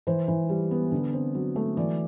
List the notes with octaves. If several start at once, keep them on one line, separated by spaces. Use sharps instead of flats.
E3 C5
E3
G3
B3
D3
C4
F#3
A3
E3 D5